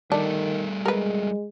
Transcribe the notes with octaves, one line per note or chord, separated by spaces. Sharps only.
D#3 G3 A3 D4 A4
G#3 A#4 B4